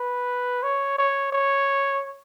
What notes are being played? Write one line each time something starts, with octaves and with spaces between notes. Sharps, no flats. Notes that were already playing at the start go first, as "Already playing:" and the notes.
Already playing: B4
C#5
C#5
C#5